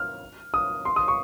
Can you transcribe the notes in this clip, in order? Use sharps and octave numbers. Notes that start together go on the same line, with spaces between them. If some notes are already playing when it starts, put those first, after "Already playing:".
Already playing: F6
D#6
C6
D#6
C#6